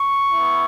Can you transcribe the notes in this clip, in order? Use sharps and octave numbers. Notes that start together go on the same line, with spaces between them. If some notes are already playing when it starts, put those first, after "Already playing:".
Already playing: C#6
B3 E4